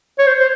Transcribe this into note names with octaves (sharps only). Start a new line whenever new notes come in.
C#5
C5
C5